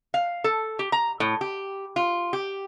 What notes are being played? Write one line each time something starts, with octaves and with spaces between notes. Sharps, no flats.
F5
A4
G4
A#5
A2
G4
F4
G4